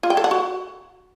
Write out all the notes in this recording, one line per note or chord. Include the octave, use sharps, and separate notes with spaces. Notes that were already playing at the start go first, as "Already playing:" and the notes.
F4
G5
A4
F#5
F#4